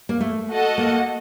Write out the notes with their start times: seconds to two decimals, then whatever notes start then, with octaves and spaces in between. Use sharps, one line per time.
0.09 A#3
0.21 A3
0.49 F#4 A4 D#5 F#5 A5
0.78 A#3